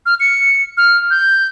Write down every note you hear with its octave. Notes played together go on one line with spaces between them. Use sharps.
F6
C#7
F6
G6